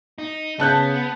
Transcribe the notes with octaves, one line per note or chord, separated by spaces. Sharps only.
D#4
C#3 B3 A5 F#6 G6